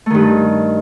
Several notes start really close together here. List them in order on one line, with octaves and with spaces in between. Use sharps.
A3 D#3 G2